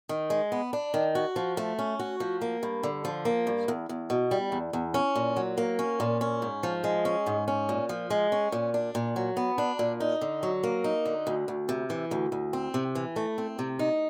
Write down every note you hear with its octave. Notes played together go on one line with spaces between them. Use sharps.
D#3
G#3
B3
D4
D#3
F#4
F3
A3
C#4
F#4
F3
A#3
G2
D3
F3
A#3
G2
E2
E2
B2
G3
E2
E2
C#4
A#2
F#3
A#3
C#4
A#2
C#4
G#2
F3
G#3
C#4
G#2
C#4
A#2
F3
G#3
C#4
A#2
D4
A#2
F#3
B3
D4
A#2
D#4
D3
F#3
A#3
D#4
D3
D2
D2
C3
E3
D2
D2
C4
C3
E3
A3
C4
C3
D#4